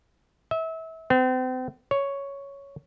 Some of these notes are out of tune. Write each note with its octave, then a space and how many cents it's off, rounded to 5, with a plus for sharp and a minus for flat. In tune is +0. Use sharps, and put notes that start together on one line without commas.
E5 -30
C4 -40
C#5 +5